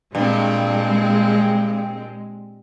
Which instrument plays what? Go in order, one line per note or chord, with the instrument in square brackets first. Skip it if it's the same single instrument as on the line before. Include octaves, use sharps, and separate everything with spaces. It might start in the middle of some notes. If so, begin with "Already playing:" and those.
[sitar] G2 [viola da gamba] A#2 C4 [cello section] G#3